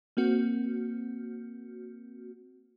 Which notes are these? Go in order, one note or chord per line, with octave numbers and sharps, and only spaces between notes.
A#3 C4 F#4